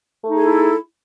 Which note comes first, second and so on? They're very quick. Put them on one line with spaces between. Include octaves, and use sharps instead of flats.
A3 D#4 G#4 A4 E4